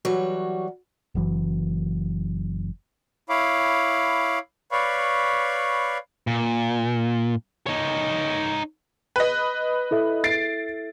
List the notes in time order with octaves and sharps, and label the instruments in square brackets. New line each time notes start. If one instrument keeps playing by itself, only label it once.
[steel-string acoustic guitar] E3 F#3 G3 F#4 C#5
[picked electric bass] F#1 F#2 E3
[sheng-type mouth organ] E4 C#5 F5 B5 D6
B4 C#5 D5 F5 B5 C#6
[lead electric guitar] A#2
D#4 C#5
[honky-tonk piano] B4 D#5
[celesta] E4 A4 E5
[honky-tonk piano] A6 C7 D7